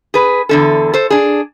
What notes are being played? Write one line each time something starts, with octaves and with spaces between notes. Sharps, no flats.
G#4 B4
E2 D3 A4
A4 C5
D4 G#4